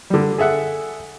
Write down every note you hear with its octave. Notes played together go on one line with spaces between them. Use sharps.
D3 G3
G#4 A4 E5 F#5